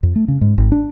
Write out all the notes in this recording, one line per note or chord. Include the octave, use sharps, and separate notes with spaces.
F2
A3
C#3
G#2
G#1
D4